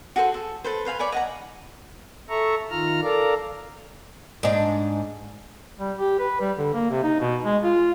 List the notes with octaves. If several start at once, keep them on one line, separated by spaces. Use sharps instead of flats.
F#4 G#4 A4 C5
A4
A4 B4 C5
B4 C5 F5 G#5
C#5 D5 G#5 B5
D#5 F#5 A#5
A4 E5 A#5 C#6
D#3 F4 A#5 F6
A4 A#4 D5 F5 A#5
G#2 D4
G3
G4
B4
G3
D3
A#3
C3
D#4
B2
G#3
F4